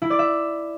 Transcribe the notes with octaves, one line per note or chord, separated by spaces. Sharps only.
E4
D5
E5